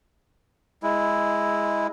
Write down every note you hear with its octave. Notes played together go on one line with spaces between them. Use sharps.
G#3 E4